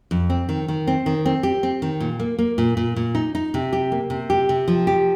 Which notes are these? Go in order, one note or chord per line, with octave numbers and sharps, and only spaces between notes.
F2
C4
D#3
D#3
C4
D#3
C4
G4
C4
D#3
A#2
A#3
A#3
A#2
A#2
A#2
D#4
D#4
C3
G4
A#3
C3
G4
C3
F3
G4